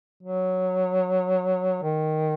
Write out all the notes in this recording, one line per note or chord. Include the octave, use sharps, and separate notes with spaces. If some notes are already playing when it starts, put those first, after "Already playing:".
F#3
D#3